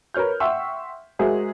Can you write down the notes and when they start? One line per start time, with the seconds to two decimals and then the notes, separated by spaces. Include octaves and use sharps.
0.14 A#4 B4 C#5 F6 G6
0.40 E5 F#5 G5 C6 C#6 E6
1.19 G#3 F#4 G#4 A#4 C5 E5